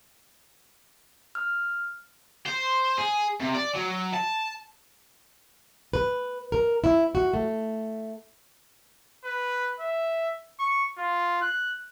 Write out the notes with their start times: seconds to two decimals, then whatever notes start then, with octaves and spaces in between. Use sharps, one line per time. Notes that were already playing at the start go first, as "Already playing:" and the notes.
1.35 F6
2.47 C5
2.98 G#4
3.40 C3
3.54 D5
3.75 F#3
4.14 A5
5.93 B4
6.52 A#4
6.84 E4
7.15 F#4
7.34 A3
9.25 B4
9.80 E5
10.59 C#6
10.98 F4
11.42 F#6